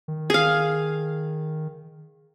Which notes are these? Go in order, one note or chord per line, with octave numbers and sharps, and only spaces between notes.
D#3
G#4 F5